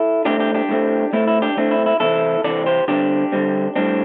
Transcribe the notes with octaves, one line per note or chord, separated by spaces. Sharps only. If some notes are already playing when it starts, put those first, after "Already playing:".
Already playing: E4 A4
A2 A3 C4 D4 G4
D4 G4
D4 G4
A2 A3 C4
A2 A3 C4 E4
E4
D4 G4
A2 A3 C4 D4
E4
E4
C3 E3 C4 E4 A4
C3 E3 C4 A4 D5
G4 C5
D3 G3 C4 D4 G4
D3 G3 C4
A2 G3 C4 D4